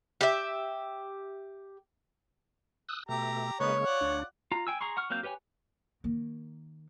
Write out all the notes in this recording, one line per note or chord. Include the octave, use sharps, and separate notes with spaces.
G4 E5
D#6 E6 F#6
B2 A3 G4 A#5
C#3 G#3 A#3 B3 D#4 C#5
F4 D5 F#5
D2 D4
F4 A#5
G5 G#5 E6
G#4 A#5 C6 C#6
F#5 C#6 F6
F#3 A#3 C4 F5 G6
G4 B4 C#5 G5 G#5
D#3 A#3